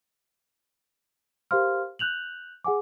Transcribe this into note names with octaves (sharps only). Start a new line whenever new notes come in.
G4 A#4 C5 F5 C6 F6
F#6 G6 F7 F#7
G#4 F#5 G#5 D6